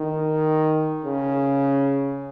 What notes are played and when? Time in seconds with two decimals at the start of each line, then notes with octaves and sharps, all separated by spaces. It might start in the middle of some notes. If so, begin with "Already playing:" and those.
Already playing: D#3
1.05 C#3